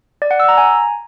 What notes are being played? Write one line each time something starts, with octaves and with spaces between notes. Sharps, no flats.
D5
F#5
E6
A#5
G#5